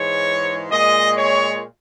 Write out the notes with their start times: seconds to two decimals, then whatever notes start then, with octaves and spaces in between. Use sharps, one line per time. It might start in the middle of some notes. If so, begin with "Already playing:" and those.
Already playing: G#2 E3 G#3 C#5
0.70 A#2 G#3 D#5
1.16 C#5